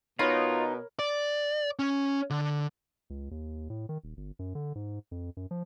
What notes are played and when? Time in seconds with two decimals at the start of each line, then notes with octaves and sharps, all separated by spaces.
0.19 B2 D#4 F4 A#4 C#5 B5
0.99 D5
1.79 C#4
2.30 D3
3.10 C#2
3.31 D#2
3.70 A2
3.89 D#3
4.04 D#1
4.17 G1
4.39 F#2
4.55 D3
4.75 G#2
5.11 F2
5.37 F#2
5.51 F3